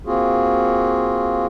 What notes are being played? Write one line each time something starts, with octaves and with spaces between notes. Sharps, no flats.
A#3 C4 F4 F#4 G#4